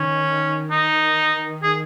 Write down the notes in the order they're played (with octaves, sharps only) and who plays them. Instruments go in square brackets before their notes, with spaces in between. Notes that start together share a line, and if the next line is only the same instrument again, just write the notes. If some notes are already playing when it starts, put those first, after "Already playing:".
Already playing: [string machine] D#3 [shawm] C#4
[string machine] D#3
[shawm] D#4
G#4